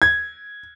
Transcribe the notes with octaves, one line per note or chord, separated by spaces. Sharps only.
G#6